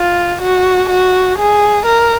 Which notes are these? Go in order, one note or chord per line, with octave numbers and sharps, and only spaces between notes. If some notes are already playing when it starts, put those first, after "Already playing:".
Already playing: F4
F#4
F#4
G#4
A#4